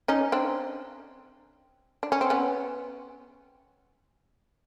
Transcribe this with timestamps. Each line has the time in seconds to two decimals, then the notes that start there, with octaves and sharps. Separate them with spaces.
0.08 C#4 D#4
0.32 C4 D4
2.03 D4
2.12 C#4
2.21 C4
2.30 B3 C#4